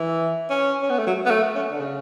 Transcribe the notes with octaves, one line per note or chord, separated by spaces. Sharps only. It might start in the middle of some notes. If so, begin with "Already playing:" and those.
Already playing: E3
C#4
C#4
B3
A3
F#3
B3
A3
C#4
D3
C#3